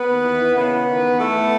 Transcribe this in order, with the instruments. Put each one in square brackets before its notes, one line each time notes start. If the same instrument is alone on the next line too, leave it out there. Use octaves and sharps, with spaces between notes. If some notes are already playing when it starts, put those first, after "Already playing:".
Already playing: [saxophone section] B3 B4
D#2
E3
E3
C#3 B3 B4
E3
D#3
E2
E3 A3 A4
B3